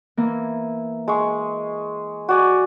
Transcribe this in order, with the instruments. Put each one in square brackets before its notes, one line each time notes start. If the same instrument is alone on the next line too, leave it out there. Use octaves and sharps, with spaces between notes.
[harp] E3 A#3
[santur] G#3 C#6
F#4 D5 G#5